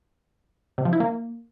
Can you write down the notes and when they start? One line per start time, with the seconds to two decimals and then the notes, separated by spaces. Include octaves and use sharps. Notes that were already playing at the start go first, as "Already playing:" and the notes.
0.78 C3
0.85 F3
0.93 E4
1.00 A#3